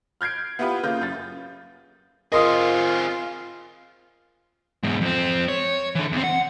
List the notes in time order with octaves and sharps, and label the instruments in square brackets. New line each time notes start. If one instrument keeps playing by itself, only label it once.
[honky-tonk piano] F6 G6 G#6 C7 D7
B3 E4 F4 G4 B4
C#3 A#3 F4 G6
F#2 A6
[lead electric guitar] C4 G#4 [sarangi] F4 [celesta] A#4 D#6 [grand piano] D#5 C6
[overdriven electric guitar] E2 G#2
F2 C4
C#5
D3 E3
E2 C4
F#5